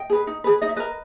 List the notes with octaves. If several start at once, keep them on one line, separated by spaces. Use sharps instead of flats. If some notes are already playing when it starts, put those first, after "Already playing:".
Already playing: D#5 G5
G#4 B4
D#4
G#4 B4
D#4 D#5
E5
A#4 B4 D#5